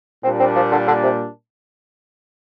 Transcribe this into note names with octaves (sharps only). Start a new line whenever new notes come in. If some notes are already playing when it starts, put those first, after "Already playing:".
A#2 G3 C4 D4
C4
F3
D3
D3
C3